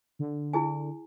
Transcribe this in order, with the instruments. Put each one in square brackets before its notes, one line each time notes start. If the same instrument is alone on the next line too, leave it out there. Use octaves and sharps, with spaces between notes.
[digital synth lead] D3
[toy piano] E4 G#4 G#5